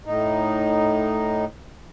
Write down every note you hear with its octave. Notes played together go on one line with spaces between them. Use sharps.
A2 D#4